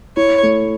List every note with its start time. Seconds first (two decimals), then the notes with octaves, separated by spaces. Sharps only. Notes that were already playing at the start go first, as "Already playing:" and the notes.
0.17 E4 C#5
0.43 A3